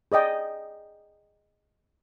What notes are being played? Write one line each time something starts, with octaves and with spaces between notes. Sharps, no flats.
G#4 D5 D#5 G5